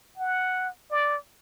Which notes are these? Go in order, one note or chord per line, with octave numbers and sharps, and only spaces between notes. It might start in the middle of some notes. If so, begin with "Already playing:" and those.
F#5
D5